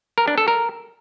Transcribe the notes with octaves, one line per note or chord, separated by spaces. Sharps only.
A#4
D4
A4
A#4